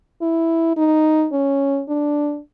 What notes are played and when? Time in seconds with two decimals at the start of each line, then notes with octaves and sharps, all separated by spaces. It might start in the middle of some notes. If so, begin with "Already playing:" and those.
0.22 E4
0.77 D#4
1.32 C#4
1.89 D4